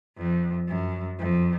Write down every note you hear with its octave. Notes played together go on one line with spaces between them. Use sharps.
F2
F#2
F2